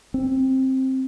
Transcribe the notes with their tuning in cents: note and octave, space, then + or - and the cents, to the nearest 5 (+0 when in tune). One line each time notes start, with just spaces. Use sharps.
C4 +10